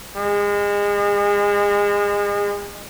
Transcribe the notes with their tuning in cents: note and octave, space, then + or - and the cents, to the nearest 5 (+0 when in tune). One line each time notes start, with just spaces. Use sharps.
G#3 -30